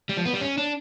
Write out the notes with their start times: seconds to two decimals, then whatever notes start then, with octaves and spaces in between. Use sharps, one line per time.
0.09 G3
0.17 F3
0.25 B3
0.33 G3
0.41 C#4
0.58 D4